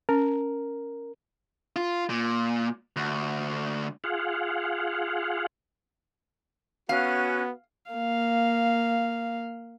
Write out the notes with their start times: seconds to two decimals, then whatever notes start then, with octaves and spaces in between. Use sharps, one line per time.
0.09 C#4 A#4
1.76 F4
2.10 A#2
2.96 D2
4.04 F4 G#4 F5 F#5
6.89 B3 C#4 F#4 F5 F#6
7.91 A#3 F5